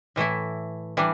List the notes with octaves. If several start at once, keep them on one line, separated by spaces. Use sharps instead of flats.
A2 E3 A3 E4
E3 G3 D4